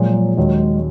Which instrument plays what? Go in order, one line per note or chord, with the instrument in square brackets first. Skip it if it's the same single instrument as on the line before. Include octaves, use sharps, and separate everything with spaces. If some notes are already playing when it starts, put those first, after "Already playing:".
Already playing: [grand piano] A#2 F3 G#3 [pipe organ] F#3
[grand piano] D#2 D#3 F#3 C#4 [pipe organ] G#3